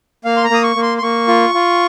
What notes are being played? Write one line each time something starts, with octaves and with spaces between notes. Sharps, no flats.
A#3 F5
C6
A#5
A#3 D#6
C#6
A#3
C6
C6
A#3 C#6
F4
F4